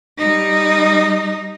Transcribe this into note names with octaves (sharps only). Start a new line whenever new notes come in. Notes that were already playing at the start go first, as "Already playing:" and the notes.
G3 D#4